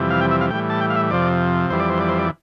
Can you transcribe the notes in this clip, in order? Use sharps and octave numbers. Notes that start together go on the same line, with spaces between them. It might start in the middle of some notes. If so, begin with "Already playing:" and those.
Already playing: F2 C3 E3 G3
F5
G5
E5
F5
A2 E3 G3 G5
A5
G5
F5
E5
F2 C3 F3 D5
F2 E3 G3 C5
D5
C5
D5
C5
D5